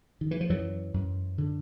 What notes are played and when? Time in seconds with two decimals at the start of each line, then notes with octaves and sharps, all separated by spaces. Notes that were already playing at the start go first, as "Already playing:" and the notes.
0.21 D#3
0.31 E3
0.41 F3
0.50 F#2 E3 F#3
0.94 F#2
1.38 D3